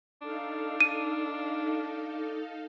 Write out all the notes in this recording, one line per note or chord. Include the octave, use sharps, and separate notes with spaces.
D4 D#4 A4 F5
D#7